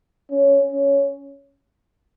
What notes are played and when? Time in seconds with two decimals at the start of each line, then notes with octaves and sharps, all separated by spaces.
0.31 C#4
0.72 C#4